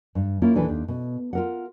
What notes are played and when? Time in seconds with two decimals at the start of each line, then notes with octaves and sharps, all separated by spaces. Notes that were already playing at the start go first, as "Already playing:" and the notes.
0.15 G2
0.42 A#3 C#4 E4 F4
0.54 D#2 A#2 E3 D4 A4 B4
0.68 D#2 D4
0.88 B2
1.33 F4 A#4 F#5